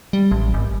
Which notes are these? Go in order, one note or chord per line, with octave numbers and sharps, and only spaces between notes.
G3
A1
G#1